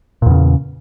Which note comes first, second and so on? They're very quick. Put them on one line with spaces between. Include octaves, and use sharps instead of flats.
A#2 E2 C#3